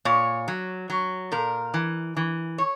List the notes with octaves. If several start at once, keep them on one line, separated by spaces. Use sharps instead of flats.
A#2 C#5
F#3
F#3
A#2 A#4
E3
E3
C#5